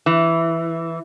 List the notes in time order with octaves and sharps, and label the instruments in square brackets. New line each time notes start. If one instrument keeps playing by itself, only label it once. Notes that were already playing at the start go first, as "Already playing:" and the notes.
[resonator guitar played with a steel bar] E3